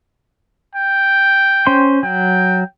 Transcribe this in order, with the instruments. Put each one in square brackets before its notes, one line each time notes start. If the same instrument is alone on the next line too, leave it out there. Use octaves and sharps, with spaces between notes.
[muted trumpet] G5
[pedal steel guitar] C#4 C5 C6
[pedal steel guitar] F#3 [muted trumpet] G5